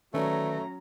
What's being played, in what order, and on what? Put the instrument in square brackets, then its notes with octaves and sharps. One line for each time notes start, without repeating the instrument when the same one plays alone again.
[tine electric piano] D#3 B4 D5 [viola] F#3 A#5 [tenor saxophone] A3 [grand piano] C#4